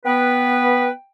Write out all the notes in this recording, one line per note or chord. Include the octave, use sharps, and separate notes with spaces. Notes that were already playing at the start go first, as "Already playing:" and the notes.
B3 B4 G5